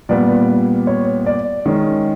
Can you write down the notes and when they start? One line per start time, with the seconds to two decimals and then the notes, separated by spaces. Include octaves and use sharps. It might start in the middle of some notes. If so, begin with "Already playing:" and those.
0.09 A#2 G3 B3 D5
0.87 C#5
1.26 D5
1.66 D#3 G#3 C#4